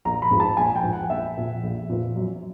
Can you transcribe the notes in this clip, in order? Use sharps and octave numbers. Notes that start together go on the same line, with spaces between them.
A#1 A#5
B5
G#2 F3
A5
A#1 G#5
G5
G#2 F3
F#5
A#1 E5
A#2 F3
A#1
A#2 F3
F#2